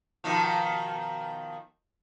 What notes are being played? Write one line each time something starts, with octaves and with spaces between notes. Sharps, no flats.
B2 D#3 F3